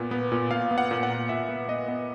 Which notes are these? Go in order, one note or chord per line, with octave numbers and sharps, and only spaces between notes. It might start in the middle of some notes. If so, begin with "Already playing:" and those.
Already playing: A#2 B3
B3
A#2
A#2 F5
B3
F#5
A#2
F#5
A#2
A#2 E5
B3
B3 D#5
B3